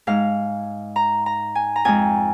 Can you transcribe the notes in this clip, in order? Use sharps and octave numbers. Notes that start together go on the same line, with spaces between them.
G#2 G#3 F5
A#5
A#5
G#5
A#5
F2 F3 G#3 G#5